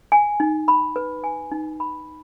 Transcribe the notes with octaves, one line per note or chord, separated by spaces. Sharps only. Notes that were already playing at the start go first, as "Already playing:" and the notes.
G#5
D#4
B5
B4
G#5
D#4
B5